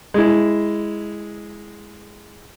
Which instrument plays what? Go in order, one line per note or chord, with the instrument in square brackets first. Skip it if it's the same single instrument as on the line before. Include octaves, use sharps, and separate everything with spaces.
[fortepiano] G#3 E4